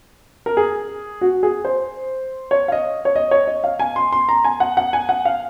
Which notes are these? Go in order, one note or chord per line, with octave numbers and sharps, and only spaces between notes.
A#4
G#4
F#4
G#4
C5
C#5
F5
D#5
C#5
D#5
C#5
D#5
F5
G#5
C6
C6
A#5
G#5
F#5
F#5
G#5
F#5
F5